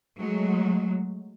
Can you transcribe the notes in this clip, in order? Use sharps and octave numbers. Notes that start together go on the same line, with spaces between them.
F#3 G#3 A3